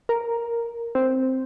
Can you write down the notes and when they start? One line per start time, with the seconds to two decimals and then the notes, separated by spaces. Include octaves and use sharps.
0.09 A#4
0.95 C4